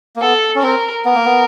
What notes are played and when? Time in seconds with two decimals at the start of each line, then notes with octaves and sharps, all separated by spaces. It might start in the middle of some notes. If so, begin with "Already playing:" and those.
0.16 A#3
0.21 B3 A4
0.55 C#4
0.62 C4 A#4
1.05 B3 A#4
1.15 A#3
1.25 B3